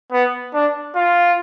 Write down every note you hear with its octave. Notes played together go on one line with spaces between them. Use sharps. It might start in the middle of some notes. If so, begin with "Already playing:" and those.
B3
D4
F4